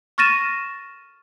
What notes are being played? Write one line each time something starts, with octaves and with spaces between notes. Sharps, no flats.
C#6 F6 A6 A#6 D#7 E7